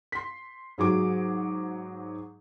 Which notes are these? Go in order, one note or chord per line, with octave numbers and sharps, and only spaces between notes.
C6 B6
G#2 F#3 G#4 D6